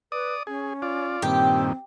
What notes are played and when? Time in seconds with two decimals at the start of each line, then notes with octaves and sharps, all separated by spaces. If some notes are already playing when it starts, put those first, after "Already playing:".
0.12 B4 D5 D#6
0.47 C#4 G#4
0.82 F4 D5
1.22 G2 A#2 D#3 C4 G4